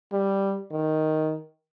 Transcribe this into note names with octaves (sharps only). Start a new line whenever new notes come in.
G3
D#3